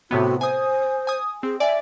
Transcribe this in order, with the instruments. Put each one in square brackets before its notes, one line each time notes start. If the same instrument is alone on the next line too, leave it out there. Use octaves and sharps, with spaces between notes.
[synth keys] A2 C3 B3 [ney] F#4
[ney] C5 [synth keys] G#5 D#6
[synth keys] G#5 D#6
[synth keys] C4 [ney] G#4
[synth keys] D5 G#5 [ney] E5